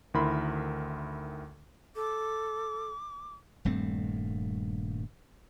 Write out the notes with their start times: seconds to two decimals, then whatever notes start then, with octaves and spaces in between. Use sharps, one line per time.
0.14 D2 D#3 E4 A#4 B5 C6
1.96 A4 D6
3.65 D#1 G2 A3 C4